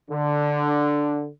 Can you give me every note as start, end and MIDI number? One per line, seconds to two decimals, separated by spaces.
0.11 1.28 50